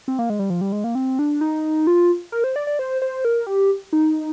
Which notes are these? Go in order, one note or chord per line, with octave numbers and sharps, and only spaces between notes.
C4
A#3
G#3
G3
F3
G3
G#3
A#3
C4
D4
D#4
F4
A#4
C5
D5
D5
C5
C5
A#4
G4
D#4